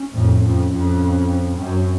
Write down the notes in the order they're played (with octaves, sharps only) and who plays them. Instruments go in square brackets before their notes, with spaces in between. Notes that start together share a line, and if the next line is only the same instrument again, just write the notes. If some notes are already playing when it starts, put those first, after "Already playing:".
Already playing: [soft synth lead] C#4
[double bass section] F2 A2
F2
F2
[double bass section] F#2 [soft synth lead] C4